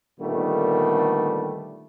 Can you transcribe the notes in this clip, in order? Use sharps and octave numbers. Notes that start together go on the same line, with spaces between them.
A#2 D3 D#3 G3 A3 B3